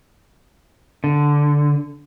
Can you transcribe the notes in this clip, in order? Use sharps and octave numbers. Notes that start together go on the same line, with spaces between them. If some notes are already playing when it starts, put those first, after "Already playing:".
D3